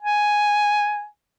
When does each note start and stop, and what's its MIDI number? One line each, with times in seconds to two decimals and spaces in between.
0.02 1.06 80